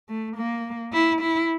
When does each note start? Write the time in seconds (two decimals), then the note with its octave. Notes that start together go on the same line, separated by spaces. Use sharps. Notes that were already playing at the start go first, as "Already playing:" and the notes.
0.09 A3
0.37 A#3
0.93 E4
1.21 E4